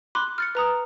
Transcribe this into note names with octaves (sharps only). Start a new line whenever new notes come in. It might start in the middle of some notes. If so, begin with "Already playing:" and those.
B5 C6 D6 F#6
F6 A6 C#7
B4 A#5 D#6